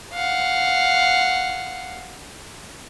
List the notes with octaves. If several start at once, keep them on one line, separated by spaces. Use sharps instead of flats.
F5 F#5